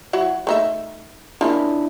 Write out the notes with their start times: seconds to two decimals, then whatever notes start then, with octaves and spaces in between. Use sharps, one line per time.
0.13 F#3 E4 F#4
0.47 A3 D#4 E5
1.41 F3 A#3 C#4 D4 E4